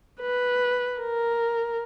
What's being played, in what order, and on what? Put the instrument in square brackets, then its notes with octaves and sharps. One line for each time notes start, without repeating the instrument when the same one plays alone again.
[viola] B4
A#4